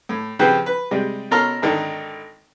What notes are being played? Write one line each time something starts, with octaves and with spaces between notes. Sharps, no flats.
A2
C#3 F3 C4 F#4 G4 B4
B4
C3 G3 G#3
B2 C#4 A4 A#4 C6 F6
G#1 D3 D#3